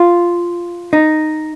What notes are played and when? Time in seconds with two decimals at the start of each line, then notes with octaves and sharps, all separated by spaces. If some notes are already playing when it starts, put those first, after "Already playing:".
Already playing: F4
0.93 D#4